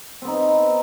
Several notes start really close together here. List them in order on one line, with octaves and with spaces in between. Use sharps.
C4 B3 D#4